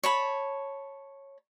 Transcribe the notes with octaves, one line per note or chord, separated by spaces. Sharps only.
C#5 A5 B5